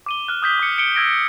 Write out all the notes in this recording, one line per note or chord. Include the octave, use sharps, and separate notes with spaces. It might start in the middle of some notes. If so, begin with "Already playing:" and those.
D6 D#7 G7
F6 F#6
D#6 G6 B6 G7
D6 C#7
C#7 D7 G7
E6 G#6 A#6 D7